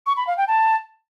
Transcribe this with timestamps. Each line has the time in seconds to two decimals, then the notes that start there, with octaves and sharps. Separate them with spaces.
0.06 C#6
0.17 B5
0.27 F5
0.37 G5
0.48 A5